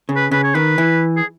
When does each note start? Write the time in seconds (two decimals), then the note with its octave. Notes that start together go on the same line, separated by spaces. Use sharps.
0.09 C#3
0.16 B4
0.31 C#3 B4
0.44 C#5
0.54 D#3 B4
0.78 E3
1.17 G#4